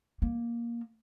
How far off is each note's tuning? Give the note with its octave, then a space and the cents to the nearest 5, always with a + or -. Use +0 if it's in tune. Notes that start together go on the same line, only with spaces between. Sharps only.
A#3 +10